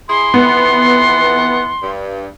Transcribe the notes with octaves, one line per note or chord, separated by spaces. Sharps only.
E4 G#4 C6
F2 E3 B3 F#5
G2